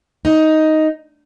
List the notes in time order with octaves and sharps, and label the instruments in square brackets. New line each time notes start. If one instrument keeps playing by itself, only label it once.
[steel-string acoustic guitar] D#4